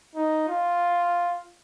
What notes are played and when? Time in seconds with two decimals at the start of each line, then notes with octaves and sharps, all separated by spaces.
0.15 D#4
0.49 F4